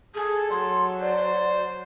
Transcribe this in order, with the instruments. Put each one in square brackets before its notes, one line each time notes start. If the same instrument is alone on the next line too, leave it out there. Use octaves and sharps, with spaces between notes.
[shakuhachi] G#4 [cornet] A4
[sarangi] F#3 [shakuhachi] C6
[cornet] C5 [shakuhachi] D5